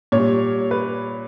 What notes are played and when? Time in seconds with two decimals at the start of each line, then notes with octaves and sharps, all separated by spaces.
0.12 A#2 C#5
0.17 G3
0.71 B4